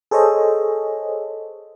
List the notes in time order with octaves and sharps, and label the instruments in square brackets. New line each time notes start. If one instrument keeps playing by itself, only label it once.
[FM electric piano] G#4 A4 C5 C#5 D#5